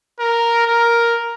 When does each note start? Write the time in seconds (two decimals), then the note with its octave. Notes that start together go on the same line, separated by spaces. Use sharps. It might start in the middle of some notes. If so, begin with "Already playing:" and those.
0.20 A#4
0.67 A#4